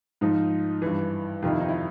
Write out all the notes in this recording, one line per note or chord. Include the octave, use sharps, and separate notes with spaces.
G#2 F3 D#4 F4
G2 E3
F2 C3 D#3 F4
E4
D#4
E4